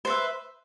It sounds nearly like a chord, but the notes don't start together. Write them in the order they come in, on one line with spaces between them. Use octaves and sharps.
C5 B4 E5